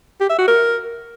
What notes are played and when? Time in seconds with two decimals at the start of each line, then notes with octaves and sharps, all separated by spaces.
0.20 G4
0.29 E5
0.38 F#4
0.47 A#4